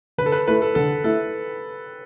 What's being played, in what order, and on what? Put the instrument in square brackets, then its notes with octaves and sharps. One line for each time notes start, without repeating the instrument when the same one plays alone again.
[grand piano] D3 [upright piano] B4
[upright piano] A4
B4
[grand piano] A3 E4 [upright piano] B4
[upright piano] A4
[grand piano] D3 [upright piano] A4
[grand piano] A3 E4 [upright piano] A4